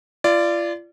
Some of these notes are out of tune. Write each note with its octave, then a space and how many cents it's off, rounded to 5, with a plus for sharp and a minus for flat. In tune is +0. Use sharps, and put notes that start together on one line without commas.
F4 -35 D5 +0